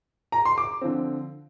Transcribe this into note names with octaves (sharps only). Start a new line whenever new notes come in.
A#5
C6
D6
D3 F3 C4